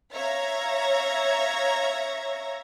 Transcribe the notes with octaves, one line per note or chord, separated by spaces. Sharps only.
C#5 E5 F5 A#5 G#6 A#6